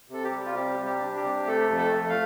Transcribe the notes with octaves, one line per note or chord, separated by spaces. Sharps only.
C3 A4
G4
G3
F4
C3 G4
G3
G4
D4
G4
C3
A3 A4
F2
A4
A3
F5